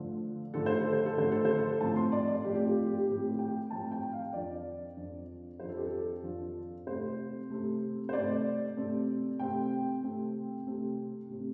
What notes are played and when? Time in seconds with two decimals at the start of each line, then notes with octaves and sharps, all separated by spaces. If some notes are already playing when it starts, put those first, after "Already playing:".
Already playing: D3 F3 A3
0.54 D3 F3 A3 A4
0.66 C5
0.80 A4
0.93 C5
1.06 A4
1.17 D3 F3 A3 C5
1.32 A4
1.45 C5
1.58 A4
1.81 A2 F3 A3 C4 A5
1.96 C6
2.12 D5
2.28 D5
2.44 A2 F3 A3 C4 G4
2.55 G4
2.65 F4
2.86 G4
3.08 A2 F3 A3 C4 G4
3.39 G5
3.71 A2 F3 A3 C4 A5
3.91 G5
4.13 F5
4.33 F2 F3 D4 D5
4.96 F2 F3 D4
5.60 F2 F3 D4 C5
5.69 A4
5.77 G4
5.87 A4
6.23 F2 F3 D4
6.87 C3 A3 C4 C5
7.50 C3 A3 C4
8.09 C5
8.13 C3 A3 C4 D5
8.77 C3 A3 C4
9.39 C3 A3 C4 G5
10.03 C3 A3 C4
10.67 C3 A3 C4
11.30 C3 A3 C4